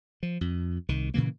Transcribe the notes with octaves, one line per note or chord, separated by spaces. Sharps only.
F3
F2
C2 D#3
A#2 C#3 E3 A#3